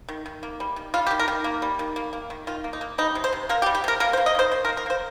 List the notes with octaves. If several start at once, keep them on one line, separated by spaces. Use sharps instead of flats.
D#3
D#3
A#3
G3
D#3
G3 F4
G4
D#3
A#4
D#3
A#3
G3
D#3
A#3
A#3
D#3
D#3 F4
A#3
D#4
A#3
G3 D#4
C3
C5
C3
A#3 A#4
G4
G3
G4
C3 A#4
A#3 A#4
C5
A#3
D#5
D#3 C5
D#3 C5
A#4
A#3
A#4
A#3 C5